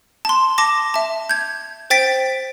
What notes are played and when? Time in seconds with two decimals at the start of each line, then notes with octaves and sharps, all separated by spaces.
0.25 A5 C6
0.58 A5 D6 A#6
0.94 E5 A5
1.29 G6 G#6
1.90 C5 G5 A6 B6 D7